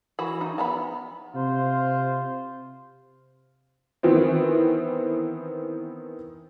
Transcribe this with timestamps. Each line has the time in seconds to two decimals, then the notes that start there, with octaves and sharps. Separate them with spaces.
0.19 E3 F#4 B5
0.41 D#4
0.58 B3 A#5 B5
1.35 C3 F4 C5
4.03 D#3 E3 B3 C4